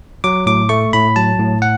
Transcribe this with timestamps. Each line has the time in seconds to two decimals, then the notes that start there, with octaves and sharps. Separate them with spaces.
0.24 F#3 D6
0.46 A2 D6
0.69 A3 C#6
0.93 A2 B5
1.16 F#3 A5
1.39 A2
1.62 F#5